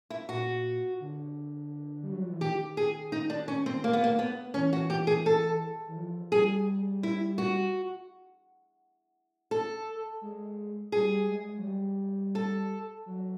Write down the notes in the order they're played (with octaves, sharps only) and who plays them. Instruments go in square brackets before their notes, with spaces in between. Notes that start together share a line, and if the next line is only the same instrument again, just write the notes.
[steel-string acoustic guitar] E4
[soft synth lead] A#2 [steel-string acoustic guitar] F#4
[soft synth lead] D3
G3
F#3
F3
E3
[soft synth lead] D#3 [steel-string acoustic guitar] G4
[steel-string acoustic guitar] G#4
D#4
D4
C#4
C4
A#3
B3
A#3
B3
[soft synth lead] E3 [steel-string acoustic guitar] C#4
[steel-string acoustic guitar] F#4
G4
G#4
A4
[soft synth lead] E3
F3
[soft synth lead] G3 [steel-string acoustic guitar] G#4
[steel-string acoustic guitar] E4
F#4
A4
[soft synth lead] G#3
[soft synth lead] G3 [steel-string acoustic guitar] G#4
[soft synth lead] G#3
F#3
G3
[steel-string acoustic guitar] A4
[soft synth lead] F#3